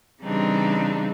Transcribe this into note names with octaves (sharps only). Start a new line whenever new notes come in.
C#3 E3 G3 C4 D4 D#4